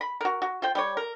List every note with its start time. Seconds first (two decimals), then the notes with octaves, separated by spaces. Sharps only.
0.01 B5
0.21 F#4 A#4
0.42 F#4
0.62 F4 C5 G5
0.75 G3 G4 C#5
0.97 A#4